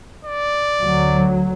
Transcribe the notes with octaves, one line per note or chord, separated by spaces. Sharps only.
D5
D2 F#3